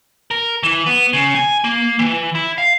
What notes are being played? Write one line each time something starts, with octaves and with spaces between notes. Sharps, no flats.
A#4
E3
B3
C#3
G#5
A#3
E3
E4
F5